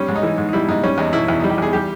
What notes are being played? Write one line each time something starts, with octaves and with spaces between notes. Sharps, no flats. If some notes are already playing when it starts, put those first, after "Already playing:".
Already playing: G3 C#4
G#2
D#4
E3
G#2
D#4
G3 E4
G#2 D#4
G3 C#4
E2 D#4
B2 E4
E2 E4
G3 D#4
G4
E2 G#4
G3 G4